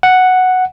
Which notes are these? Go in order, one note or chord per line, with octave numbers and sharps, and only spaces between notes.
F#5